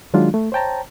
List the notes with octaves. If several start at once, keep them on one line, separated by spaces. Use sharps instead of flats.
D#3 F#3 G#3 D4 F4
A3
C5 C#5 G5 A5 A#5